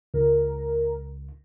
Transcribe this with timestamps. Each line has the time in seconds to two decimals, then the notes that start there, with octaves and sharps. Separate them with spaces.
0.14 C#2 A#4